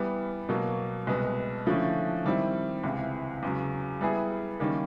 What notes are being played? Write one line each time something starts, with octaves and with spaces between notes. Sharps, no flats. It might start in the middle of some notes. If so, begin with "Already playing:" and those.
Already playing: E3 G3 B3
B2 F#3 A#3
C2 B2 G#3 B3
D3 F3 A3 C#4 E4
D#3 G3 C4 E4
C#2 C3 E3
E2 C#3 F#3
G3 B3 E4 G#4
D#3 G3 A#3 C#4